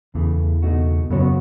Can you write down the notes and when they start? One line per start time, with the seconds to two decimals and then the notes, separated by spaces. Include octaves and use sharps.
0.15 E2 C#3 E3 A3
0.63 C#2 B2 A3 D#4 F#4
1.10 F#2 C#3 F#3 B3 F#4 C#5